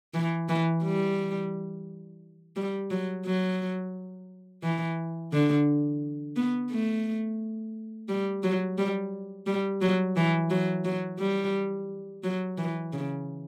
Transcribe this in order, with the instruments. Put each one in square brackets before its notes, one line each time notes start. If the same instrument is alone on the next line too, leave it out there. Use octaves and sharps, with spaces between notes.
[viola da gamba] E3
E3
G3
G3
F#3
F#3
E3
D3
B3
A3
G3
F#3
G3
G3
F#3
E3
F#3
F#3
G3
F#3
E3
C#3